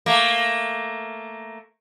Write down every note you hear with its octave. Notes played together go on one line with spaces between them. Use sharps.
A3 A#3